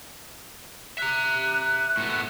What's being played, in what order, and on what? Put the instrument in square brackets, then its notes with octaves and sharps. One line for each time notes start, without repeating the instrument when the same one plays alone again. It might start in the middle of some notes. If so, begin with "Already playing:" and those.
[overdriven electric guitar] E5 A#5 [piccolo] F#6
[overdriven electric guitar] A2 B3